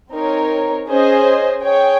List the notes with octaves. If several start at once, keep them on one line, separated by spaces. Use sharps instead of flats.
C4 D#4 A#4 C#5
C#4 G#4 C5 D#5
G#4 C#5 G5